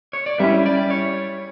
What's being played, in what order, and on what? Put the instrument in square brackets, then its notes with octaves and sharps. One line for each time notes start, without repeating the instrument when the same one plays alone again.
[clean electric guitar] C#5
D5
[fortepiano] G3 C#4 E4 [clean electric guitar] E5
[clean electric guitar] D5
C#5